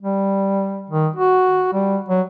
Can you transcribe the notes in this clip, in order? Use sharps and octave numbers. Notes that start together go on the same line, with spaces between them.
G3
D#3
F#4
G3
F#3